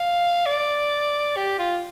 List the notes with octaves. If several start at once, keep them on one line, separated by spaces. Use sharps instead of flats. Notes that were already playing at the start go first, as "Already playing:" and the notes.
Already playing: F5
D5
G4
F4